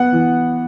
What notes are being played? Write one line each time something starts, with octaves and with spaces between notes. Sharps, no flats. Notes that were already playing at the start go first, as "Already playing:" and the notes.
Already playing: B3 F#5
E3